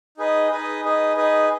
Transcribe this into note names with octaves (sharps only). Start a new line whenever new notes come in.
D#4 G#4 B4 D#5
D#4 G#4 B4 D#5
D#4 G#4 B4 D#5
D#4 G#4 B4 D#5